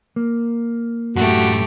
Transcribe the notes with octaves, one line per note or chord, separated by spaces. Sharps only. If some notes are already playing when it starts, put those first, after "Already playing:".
A#3
F#2 A2 A3 F#4 G4